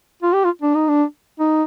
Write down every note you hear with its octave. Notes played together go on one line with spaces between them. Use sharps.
F4
G4
F4
D4
D#4
D4
D#4